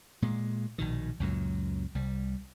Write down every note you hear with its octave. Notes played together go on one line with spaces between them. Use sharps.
A#2 G#3
A#1 B2 D#3
C#2 F#2 A#2 F#3
C2 G3